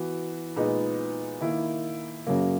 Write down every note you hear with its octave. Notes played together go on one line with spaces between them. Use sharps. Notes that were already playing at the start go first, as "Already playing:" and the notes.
Already playing: E3 B3 F#4
A#2 G#3 B3 D#4
D#3 A#3 E4
F#2 C#3 F#3 A#3